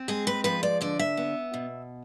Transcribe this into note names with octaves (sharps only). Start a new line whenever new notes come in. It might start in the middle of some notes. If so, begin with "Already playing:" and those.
Already playing: C4
G#3 G#4
B4
F3 B4
D5
D3 D5
E5
B3
B2